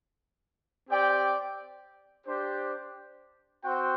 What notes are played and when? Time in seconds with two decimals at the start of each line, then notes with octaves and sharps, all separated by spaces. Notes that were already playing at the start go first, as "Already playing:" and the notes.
0.89 C4 G4 D5 G5
2.26 D4 G4 C5
3.63 C4 F#4 C5 G5